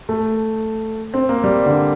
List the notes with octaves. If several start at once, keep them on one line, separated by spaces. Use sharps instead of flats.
A3
C4
A#3
G3
D3